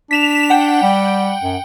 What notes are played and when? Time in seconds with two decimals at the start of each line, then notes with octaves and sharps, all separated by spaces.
0.11 D4 B6 E7 F7
0.50 F#5 G5
0.83 G3
1.42 F#2